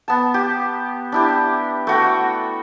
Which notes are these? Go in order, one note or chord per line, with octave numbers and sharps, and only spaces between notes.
B3 A5
G4
D4 E4 G4
A3 F#4 G5